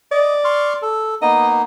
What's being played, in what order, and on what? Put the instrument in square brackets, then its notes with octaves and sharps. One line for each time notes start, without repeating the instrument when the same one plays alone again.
[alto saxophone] D5 [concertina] D#5
[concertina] C6 C#6 F6
A4
[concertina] A#3 B3 D#4 [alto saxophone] D#5